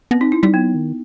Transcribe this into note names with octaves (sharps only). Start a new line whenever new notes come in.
B3 C4
C4 D#4
E4
G3 D#4
F#3 B3
D#3